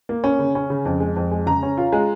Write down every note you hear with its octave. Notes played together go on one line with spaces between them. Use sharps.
A#3
C#4
C#3
C#4
C#3
F2
G#3
F2
G#3
C#3 A#5
C#4
F4
G#3